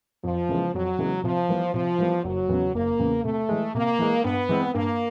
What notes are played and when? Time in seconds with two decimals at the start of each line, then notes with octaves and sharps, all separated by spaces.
0.23 F2 F3
0.49 C#3 E3 G#3 B3
0.74 F2 F#3
0.99 C#3 E3 G#3 B3
1.24 C3 F3
1.49 E3 G3 B3
1.74 C3 F3
1.99 E3 G3 B3
2.24 F#1 F#3
2.49 E2 C#3
2.74 F#1 A#3
2.99 E2 C#3
3.24 C3 A3
3.49 E3 G#3
3.75 C3 A#3
3.99 E3 G#3
4.24 G2 B3
4.49 E3 G#3 C4
4.74 G2 A#3